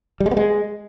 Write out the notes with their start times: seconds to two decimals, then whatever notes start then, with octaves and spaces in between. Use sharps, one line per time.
0.20 G3
0.26 G#3
0.31 B3
0.37 G#3